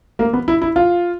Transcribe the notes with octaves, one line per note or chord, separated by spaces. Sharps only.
A#3
B3
E4
E4
F4